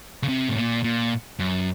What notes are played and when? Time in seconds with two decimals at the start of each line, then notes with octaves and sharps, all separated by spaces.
0.23 C#3
0.28 C3
0.49 A2
0.56 A#2
0.84 A#2
1.39 F#2